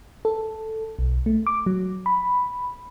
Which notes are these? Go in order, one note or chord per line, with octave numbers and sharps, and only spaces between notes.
A4
B1
A3
D6
F#3
B5